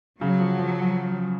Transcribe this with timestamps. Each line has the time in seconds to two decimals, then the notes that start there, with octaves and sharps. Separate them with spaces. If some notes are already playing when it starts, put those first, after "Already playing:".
0.21 C#3 F#3
0.40 F3
0.59 F3